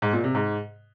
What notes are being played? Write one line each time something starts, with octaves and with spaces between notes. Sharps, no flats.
G#2
A#2
C3
G#2